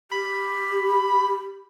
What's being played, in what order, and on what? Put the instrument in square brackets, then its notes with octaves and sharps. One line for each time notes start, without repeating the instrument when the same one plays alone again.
[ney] G4 [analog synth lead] B5